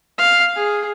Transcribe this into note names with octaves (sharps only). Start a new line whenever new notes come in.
F5
G#4